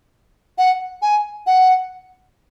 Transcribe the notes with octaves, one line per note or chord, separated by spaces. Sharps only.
F#5
G#5
F#5